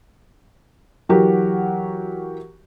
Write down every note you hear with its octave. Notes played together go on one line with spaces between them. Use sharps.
E3 F#3 F#4 G4 A#4